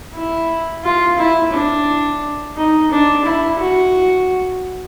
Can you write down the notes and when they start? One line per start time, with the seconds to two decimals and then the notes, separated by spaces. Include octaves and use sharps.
0.15 E4
0.84 F4
1.18 E4
1.53 D4
2.56 D#4
2.91 D4
3.25 E4
3.60 F#4